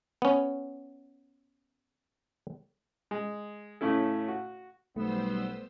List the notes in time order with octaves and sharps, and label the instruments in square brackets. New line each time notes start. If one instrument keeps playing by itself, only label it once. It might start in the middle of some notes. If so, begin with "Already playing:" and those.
[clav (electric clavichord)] B3 C#4
[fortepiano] G#3
A2 C#3 A3 C#4 E4 A4
F#4
[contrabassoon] B1 [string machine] G3 C5 E6 [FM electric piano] A3 [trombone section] B3